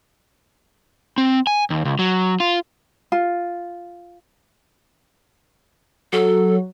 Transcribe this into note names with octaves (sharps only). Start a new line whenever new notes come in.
C4
G#5
D#2
C#2
F#3
F4
F4
F#3 A4